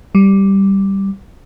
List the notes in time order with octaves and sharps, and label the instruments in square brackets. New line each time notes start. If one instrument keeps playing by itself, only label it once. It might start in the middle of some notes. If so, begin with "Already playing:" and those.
[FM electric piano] G3